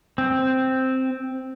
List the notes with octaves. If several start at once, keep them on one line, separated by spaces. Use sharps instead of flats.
C4